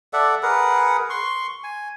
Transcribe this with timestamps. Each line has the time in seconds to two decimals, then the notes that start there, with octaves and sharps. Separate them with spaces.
0.13 A4 D5 E5 F#5
0.43 G#4 A#4 B4 F#5
1.10 C6 C#6
1.64 G#5